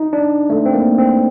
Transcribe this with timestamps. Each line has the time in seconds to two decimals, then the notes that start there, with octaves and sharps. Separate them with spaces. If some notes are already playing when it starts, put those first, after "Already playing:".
Already playing: D#4
0.13 D4
0.50 A3
0.66 C4
0.73 A#3
0.98 C4